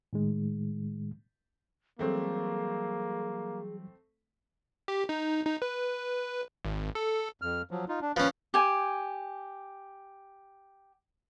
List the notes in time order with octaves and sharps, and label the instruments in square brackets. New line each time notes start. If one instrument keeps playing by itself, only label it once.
[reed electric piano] A2 D#3 G#3
[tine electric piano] E3 F#3 G3 [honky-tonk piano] A3 C4 [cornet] A#3 [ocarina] G#4
[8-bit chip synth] G4
D#4
D#4
B4
G#1
A4
[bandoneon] F2 F6
F3 F#3
D#4 F4
D4
[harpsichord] F3 C#4 [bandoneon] B4
[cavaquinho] G4 G#5